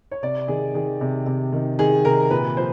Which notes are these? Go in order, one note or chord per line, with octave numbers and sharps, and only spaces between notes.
C#5
C3 D5
D#3 G#4
D#3 G#4
C3
C3
D#3
D#3 G#4
C3 A#4
A#2 B4
F3 C5